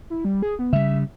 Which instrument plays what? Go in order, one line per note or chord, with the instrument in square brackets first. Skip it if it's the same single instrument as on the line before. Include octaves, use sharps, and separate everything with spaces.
[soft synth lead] E4
G3
G#4
B3
[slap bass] C#3 G3 [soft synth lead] E5